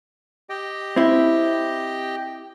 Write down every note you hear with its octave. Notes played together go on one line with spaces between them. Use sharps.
G4 D#5 G5
C4 E4